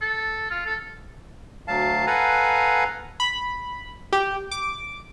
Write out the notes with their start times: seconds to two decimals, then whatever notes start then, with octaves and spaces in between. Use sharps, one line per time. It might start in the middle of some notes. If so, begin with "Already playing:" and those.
0.01 A4
0.50 F4
0.66 A4
1.68 D2 F#3 F5 A5
2.07 A4 B4 F5 F#5 G#5 A#5
3.20 B5
4.12 G4
4.51 D6